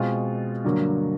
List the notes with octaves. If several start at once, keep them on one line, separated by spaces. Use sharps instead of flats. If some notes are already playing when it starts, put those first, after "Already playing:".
Already playing: B2 G#3 C4 F4
G2 D3 F#3 A#3